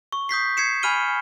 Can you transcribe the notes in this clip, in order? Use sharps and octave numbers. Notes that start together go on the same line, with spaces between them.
C#6
D#6 G6 B6 C7
G#6 C7 C#7 E7
G#5 B5 F6 D#7 G7